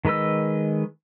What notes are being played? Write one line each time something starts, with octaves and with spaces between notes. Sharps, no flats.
D#3 G#3 B4 D#5 E6